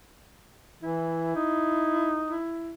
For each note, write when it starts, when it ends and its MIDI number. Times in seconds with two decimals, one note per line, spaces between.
0.83 1.31 52
0.83 2.24 64
1.35 2.38 63
2.31 2.74 64